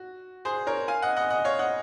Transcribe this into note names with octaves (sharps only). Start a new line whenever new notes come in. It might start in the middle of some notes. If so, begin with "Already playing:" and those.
Already playing: F#4
G#4 C5
A#4 C#5
F5 G#5
D#5 F#5
D#5 F#5
D#5 F#5
C#5 F5
D#5 F#5